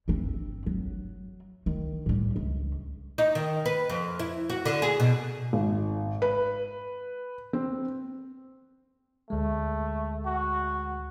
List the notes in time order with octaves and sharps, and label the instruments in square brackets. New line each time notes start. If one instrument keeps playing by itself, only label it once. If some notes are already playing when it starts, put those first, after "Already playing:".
[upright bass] G1 C4
F#3
D#3
A2 G3
C#2
[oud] D#4
D#3
B4
F2
E4
F#4
D3
G#4
B2
[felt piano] G#1
B4
C4
[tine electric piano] D2 G#3 [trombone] A3
[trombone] F#4